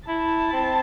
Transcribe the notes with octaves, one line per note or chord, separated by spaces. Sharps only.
E4 A5
C4